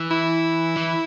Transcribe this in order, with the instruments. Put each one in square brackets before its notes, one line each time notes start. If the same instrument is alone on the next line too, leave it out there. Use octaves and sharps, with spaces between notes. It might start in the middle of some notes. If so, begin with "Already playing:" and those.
Already playing: [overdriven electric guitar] E3
[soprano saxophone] E4
[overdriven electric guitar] E3